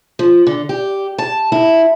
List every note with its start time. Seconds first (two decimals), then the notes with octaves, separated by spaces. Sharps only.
0.19 F3
0.47 D3
0.69 G4
1.18 A5
1.52 E4